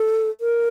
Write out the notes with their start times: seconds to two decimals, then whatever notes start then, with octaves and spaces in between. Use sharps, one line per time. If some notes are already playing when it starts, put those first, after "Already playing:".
Already playing: A4
0.41 A#4